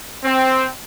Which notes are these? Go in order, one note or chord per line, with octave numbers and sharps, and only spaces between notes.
C4